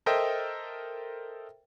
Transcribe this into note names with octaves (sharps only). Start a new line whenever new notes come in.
A4 A#4 C5 D#5 E5 G5